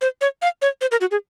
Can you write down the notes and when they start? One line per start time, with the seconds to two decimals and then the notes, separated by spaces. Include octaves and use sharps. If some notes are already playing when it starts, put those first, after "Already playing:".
0.01 C5
0.21 C#5
0.42 F5
0.62 C#5
0.81 C5
0.91 A#4
1.01 F#4
1.11 G#4